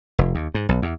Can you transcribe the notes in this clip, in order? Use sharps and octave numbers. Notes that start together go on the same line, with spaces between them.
F1
D#2
G#2
B1
E2